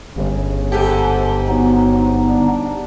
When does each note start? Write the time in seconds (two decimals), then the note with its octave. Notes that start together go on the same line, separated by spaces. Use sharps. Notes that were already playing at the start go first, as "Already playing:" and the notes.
0.16 G1 C#3
0.72 G#2 G4 A4
1.48 F#3 B3 D#4
2.29 D4